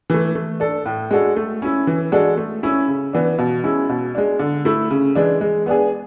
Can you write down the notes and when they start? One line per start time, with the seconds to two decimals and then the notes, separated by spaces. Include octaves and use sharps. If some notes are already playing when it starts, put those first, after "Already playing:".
0.10 E3 A3
0.35 A3
0.60 D4 A4
0.86 A2
1.11 G#3 D4 F#4 A4
1.36 A3
1.62 C#4 E4
1.87 E3
2.12 G#3 D4 F#4 A4
2.37 A3
2.63 C#4 E4
2.88 C#3
3.13 E3 B3 D4
3.38 B2
3.64 G#3 C#4 E4
3.89 B2
4.15 G#3 D4
4.39 D3
4.65 A3 E4
4.90 C#3
5.15 E3 G#3 D4
5.41 G#3
5.66 B3 D4 G#4